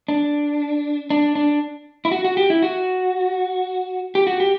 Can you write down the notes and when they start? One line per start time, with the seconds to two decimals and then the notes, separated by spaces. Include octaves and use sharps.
0.08 D4
1.10 D4
1.35 D4
2.05 E4
2.12 F#4
2.25 F#4
2.37 G4
2.50 E4
2.62 F#4
4.15 G4
4.27 F#4
4.40 G4